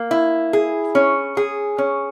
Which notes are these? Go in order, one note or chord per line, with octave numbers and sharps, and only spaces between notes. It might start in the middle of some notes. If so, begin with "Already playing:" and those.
Already playing: A#3
E4
G#4
C#4
G#4
C#4